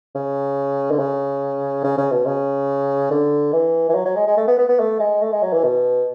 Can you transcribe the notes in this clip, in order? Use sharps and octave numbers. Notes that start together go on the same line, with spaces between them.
C#3
D3
C#3
C#3
C#3
B2
C#3
D3
E3
E3
F#3
F#3
G#3
G#3
A3
B3
B3
B3
A3
G#3
A3
G#3
F#3
E3
B2